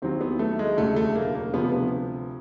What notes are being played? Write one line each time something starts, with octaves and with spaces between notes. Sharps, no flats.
D#2 D#3 F#3 C4
B3
A3
G#3
E1 D2 C#3 F#3 A3
A3
A#3
A#3
D2 C3 F3 B3
B3